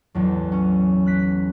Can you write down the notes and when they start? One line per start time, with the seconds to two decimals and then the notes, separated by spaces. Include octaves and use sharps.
0.15 A1 E2 F#3
0.52 C#4
1.06 F#6 B6